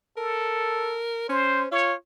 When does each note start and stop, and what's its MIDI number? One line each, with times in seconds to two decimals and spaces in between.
0.17 1.02 69
0.17 1.24 70
1.29 1.66 61
1.29 1.68 72
1.72 1.94 65
1.72 1.94 73